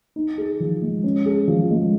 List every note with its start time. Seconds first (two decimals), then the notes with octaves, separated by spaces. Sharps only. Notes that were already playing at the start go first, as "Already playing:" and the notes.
0.16 D#4
0.38 G#4
0.60 F3
0.82 G#3
1.04 C#4
1.26 G#4
1.48 F3
1.71 G#3